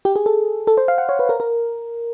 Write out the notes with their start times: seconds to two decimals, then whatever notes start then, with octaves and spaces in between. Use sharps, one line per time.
0.05 G4
0.16 G#4
0.26 A4
0.67 A4
0.77 C5
0.88 F5
0.98 F#5
1.09 C#5
1.19 B4
1.29 A#4
1.40 A#4